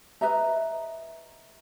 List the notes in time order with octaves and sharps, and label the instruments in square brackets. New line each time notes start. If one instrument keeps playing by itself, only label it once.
[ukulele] B4 D#5 E5 A#5